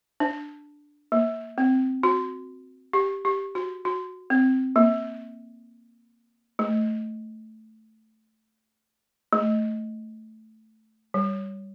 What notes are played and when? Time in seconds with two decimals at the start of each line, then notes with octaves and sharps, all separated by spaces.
0.20 D4
1.12 A#3
1.58 C4
2.03 F#4
2.93 G4
3.25 G4
3.55 F#4
3.85 F#4
4.30 C4
4.76 A#3
6.59 A3
9.33 A3
11.14 G3